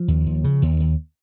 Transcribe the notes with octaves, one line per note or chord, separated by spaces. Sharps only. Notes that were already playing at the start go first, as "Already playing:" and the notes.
Already playing: F3
D#2
D#2
C#3
D#2
D#2